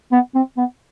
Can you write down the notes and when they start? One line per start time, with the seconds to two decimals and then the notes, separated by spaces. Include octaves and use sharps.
0.12 B3
0.35 C4
0.57 B3